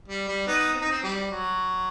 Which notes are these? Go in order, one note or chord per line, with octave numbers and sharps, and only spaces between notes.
G3
G3
B3 D#4
C4
D#4
C4
G3
F#3